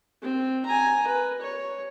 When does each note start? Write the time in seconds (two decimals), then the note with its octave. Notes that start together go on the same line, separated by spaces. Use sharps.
0.23 C4
0.65 G#5 A#5
1.07 B4
1.41 C#5